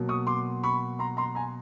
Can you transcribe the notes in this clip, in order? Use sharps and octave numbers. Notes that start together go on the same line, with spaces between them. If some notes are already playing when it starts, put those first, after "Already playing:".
Already playing: B2 F#3 A#3
C#6 D#6
C6 D6
B5 C#6
A#5 C6
A#5 C6
G#5 A#5